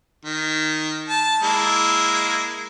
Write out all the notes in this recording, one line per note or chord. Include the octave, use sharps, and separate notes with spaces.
D#3
A5
G#3 A#3 E4